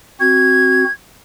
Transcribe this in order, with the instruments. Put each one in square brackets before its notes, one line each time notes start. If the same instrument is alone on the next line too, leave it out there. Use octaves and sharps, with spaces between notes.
[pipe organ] C4 F#4 [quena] G#6